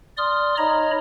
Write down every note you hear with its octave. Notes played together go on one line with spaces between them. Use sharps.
D5 C6 D#6 F6
D#4 C#5 D#5 A#5 B5